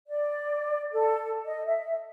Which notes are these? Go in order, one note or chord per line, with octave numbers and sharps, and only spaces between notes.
D5
A4
D#5
E5